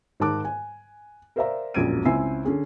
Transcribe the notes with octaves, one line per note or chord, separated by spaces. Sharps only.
G#2 D#3 A#4 A5 D6 F#6
G#5
A#4 C5 D5 E5 F5 A#5
E1 A#1 F#2 G#6 D7 D#7
C#2 C4 E4 G#5 E6 C7
D3 C#4 G#4